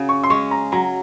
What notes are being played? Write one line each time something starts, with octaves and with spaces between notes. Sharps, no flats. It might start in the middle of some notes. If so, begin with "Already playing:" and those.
Already playing: C#3 F#4
C#6
C6
G#3 C#4 C#6
A#5
F#3 A#5